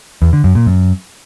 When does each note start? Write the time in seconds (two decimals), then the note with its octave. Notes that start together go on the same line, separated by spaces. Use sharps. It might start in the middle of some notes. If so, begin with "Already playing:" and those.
0.22 E2
0.33 D3
0.44 F#2
0.55 A#2
0.66 F#2